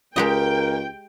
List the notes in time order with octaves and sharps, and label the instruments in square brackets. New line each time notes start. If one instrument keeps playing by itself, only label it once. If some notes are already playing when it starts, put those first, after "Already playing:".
[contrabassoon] C#2 [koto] G#3 G4 D#5 [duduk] A#4 [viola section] G5